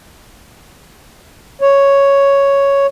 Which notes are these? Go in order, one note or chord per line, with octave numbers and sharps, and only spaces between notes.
C#5